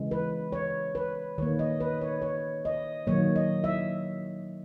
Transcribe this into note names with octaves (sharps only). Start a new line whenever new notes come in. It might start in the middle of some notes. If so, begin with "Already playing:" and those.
Already playing: C#3 E3 G#3
B4
C#5
B4
D#3 A#3 C#5
D#5
B4
C#5
C#5
D#5
D#3 F#3 A#3 C#5
D#5
E5